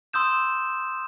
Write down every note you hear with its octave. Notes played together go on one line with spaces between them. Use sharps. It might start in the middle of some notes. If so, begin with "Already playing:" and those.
C6 D#6 E6 G6 E7